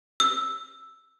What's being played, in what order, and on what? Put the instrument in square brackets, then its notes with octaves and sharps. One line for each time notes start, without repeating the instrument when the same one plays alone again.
[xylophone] E6